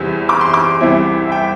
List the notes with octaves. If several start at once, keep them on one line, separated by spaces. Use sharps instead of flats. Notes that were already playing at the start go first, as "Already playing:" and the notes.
Already playing: E2 C3 G3 C4 E4 E6
D6
C6
D6
C2 C3 E3 C4 E4
E5
G5